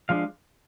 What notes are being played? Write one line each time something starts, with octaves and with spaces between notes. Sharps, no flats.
F3 G#3 D4 F5